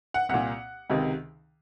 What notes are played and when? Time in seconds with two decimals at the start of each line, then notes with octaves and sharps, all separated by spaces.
0.14 F#5
0.29 C2 A#2 F#5
0.90 C#2 C3 D#3